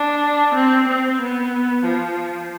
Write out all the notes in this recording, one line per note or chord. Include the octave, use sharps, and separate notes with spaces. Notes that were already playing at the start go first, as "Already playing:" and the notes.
Already playing: D4
C4
C4
B3
F3